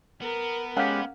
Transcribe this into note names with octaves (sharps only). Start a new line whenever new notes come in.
B3 A#4
G#3 C#4 G4 F5 F#5